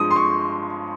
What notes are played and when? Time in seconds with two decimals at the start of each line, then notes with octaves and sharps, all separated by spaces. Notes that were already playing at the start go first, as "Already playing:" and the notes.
Already playing: G2 F3 G#3 D#6
0.11 C6
0.16 C#6